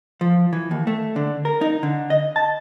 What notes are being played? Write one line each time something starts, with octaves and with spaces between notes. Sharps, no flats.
F3
E3
D#2
A3
D3
A#4
D#4
D3
D#5
A5